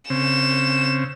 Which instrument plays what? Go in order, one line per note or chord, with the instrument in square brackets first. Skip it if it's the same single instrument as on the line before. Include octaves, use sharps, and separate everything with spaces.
[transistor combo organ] C#3 C4 [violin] E7